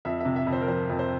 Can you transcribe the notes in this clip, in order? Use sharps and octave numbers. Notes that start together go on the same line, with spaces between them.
F2 E5
C3 E5
E5
F2
C5
A#4
F3 C5
F2
C5